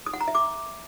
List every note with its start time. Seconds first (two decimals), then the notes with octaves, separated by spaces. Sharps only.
0.06 D#6
0.13 F#5
0.21 A#5
0.28 E5
0.35 D6